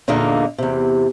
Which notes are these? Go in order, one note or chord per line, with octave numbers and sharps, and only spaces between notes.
E2 A#2 D3 A#3 D#4 D#5
E2 C3